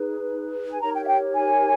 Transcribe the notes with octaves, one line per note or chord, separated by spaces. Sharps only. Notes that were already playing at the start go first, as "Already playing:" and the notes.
Already playing: D#4 G#4 B4
G#5
D#4 G4 A#4 C#5 A#5
G5
E5
G5
G#5